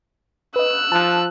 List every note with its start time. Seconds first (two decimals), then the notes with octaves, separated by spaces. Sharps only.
0.56 B4 D#5 E6 F#6
0.92 F3 A5